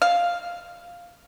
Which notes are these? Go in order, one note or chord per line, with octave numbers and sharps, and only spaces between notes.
F5